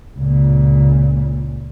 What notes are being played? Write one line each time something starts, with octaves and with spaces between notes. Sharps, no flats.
C#2 A#2